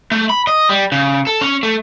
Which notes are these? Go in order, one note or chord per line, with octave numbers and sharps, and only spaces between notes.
A3
B5
D#5
G3
C#3
A4
C#4
A3